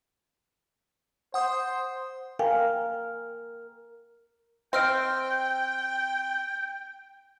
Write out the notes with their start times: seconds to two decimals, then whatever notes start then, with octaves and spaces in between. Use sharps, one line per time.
1.34 C5 F#5 D#6
2.39 A#4 F5 G5 G#5
4.73 C4 D#5 G5 F6 D7